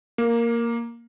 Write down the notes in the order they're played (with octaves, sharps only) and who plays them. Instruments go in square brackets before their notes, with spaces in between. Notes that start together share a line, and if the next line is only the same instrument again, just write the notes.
[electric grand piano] A#3